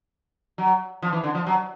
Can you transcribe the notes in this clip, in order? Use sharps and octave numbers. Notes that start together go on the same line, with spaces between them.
F#3
F3
E3
D3
F3
F#3